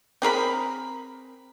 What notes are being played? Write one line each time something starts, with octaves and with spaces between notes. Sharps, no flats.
C4 G#4 A#4 B5